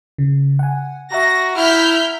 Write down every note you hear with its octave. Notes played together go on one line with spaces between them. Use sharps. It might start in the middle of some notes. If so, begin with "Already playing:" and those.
C#3
F#5 G#5
F#4 E5 F#5 A#5 A#6
E4 F6 G6 B6